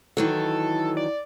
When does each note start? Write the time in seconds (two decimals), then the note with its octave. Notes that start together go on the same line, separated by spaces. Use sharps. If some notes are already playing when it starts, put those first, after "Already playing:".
0.17 D#3 E3 F#3 A4
0.97 D5